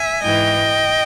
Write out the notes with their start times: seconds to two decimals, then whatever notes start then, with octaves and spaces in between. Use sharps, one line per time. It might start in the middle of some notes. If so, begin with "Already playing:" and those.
Already playing: E5 G#5
0.23 G#2 E3 D#5 G5